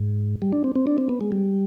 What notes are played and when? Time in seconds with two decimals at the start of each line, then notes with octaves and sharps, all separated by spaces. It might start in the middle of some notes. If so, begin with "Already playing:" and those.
Already playing: G#2
0.42 G3
0.52 D4
0.64 C4
0.76 C4
0.87 D4
0.98 C4
1.09 B3
1.21 G#3
1.32 G3